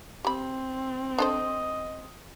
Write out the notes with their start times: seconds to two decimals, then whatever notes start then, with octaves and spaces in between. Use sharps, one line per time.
0.25 C4 G4 B5
1.18 D4 A4 C5 D#5